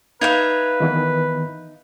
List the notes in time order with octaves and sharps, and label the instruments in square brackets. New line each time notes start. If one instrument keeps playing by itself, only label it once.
[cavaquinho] D#4 E5 F5 [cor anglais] B4 [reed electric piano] G#6
[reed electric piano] D#3 E3 B3